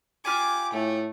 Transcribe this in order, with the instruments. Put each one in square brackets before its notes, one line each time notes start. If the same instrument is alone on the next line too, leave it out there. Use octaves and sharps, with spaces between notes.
[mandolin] F4 G4 G#5 [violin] D6
[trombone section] A2 [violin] A3